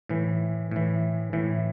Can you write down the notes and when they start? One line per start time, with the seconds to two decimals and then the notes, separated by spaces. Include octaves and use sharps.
0.09 A2 E3
0.71 A2 E3
1.33 A2 E3